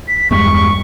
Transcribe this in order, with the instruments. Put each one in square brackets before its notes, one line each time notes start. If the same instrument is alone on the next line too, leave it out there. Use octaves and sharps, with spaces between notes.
[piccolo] B6
[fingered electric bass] E2 G2 G#3 [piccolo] C#6